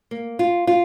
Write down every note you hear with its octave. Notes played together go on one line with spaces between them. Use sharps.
A#3
F4
F4